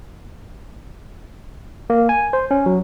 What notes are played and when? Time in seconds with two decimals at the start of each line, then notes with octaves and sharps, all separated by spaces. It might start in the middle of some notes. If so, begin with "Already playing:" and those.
1.90 A#3
2.09 G#5
2.33 C5
2.51 C#4
2.66 F#3